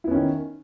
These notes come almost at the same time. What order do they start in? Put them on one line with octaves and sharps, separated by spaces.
E4 B3 C#4 D#3